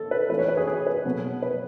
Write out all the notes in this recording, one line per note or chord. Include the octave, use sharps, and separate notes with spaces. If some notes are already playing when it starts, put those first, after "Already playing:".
Already playing: D#3 A4
B4
E3 A3 C#4 B4
C#5
B4
G#4
G#4
B4
B2 F#3 B3
B4